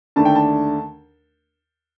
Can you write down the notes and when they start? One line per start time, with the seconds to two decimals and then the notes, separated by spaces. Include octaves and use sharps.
0.16 D#2 D3 A3 D4 A5
0.25 G5
0.35 A5